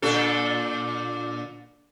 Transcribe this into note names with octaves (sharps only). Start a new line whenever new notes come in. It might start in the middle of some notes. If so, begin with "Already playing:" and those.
A#2 D4 A4